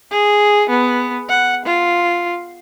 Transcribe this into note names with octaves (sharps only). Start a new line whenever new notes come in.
G#4
B3
F#5
F4